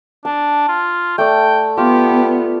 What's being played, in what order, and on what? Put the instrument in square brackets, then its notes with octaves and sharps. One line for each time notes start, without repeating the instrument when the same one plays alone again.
[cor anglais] D4 [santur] A5
[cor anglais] F4
[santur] A3 D5 [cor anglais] G5
[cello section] B3 [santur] F4 [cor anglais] G4